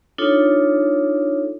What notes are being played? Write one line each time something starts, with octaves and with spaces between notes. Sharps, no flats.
D4 D#4 F4 A4 C#5